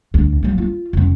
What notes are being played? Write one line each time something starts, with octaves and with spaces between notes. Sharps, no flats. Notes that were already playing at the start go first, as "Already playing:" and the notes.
D2
F#3 A#3
F4
F1 C#4